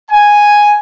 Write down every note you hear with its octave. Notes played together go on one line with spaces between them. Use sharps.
G#5